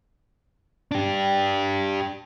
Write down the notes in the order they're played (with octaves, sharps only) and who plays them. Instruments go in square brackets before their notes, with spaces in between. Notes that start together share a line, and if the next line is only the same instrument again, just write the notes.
[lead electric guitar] D4 G4